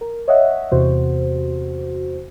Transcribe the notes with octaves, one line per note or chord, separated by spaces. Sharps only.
A#4
C#5 D#5 E5 F#5
E2 C3 F#4 C5